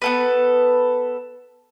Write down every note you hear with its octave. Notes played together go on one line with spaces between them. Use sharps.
B3 A4 B4